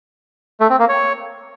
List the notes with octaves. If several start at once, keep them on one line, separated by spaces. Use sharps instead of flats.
A3
C4
A#3
C#5